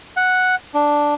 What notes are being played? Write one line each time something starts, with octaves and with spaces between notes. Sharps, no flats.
F#5
D4